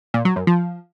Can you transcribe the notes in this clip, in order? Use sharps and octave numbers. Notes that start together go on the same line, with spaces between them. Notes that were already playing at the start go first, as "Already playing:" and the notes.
A#2
F#3
F#2
F3